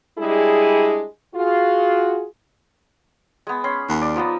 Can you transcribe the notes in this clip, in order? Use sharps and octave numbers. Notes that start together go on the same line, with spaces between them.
G3 G#3 D4 E4 G#4
F4 F#4 G#4
G#3 B3
C#4 B5 C6
D#2
D5
F3 B3 D#4